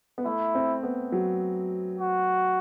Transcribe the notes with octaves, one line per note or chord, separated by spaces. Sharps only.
B3
A3 E4
C4
B3
F#3
F#4